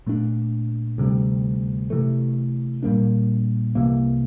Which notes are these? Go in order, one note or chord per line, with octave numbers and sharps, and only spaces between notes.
A#2 A3 D4
D2 C3 G3
C3 E3 A3
A#2 G3 A#3 D4
C2 C3 E3 A#3